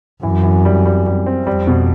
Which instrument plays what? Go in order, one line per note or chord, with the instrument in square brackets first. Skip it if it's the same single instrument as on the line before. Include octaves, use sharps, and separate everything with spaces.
[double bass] F#2 [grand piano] E3
[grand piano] E3
G3
G3
G3
C4
[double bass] F2 [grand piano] G3
[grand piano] B2